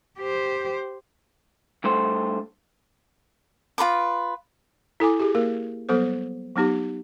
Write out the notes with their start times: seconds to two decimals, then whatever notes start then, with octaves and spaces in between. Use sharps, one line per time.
0.18 G4 C5
1.84 G2 A3 C5
3.78 F4 A#4 B4 D6
5.00 E4 A4 G#5 D6
5.19 G4 G#4
5.35 A#3 A#4
5.89 F#3 G3 B3 A4 C5
6.56 F#3 B3 D#4 G4